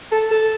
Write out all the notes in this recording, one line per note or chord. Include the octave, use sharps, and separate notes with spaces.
A4
A4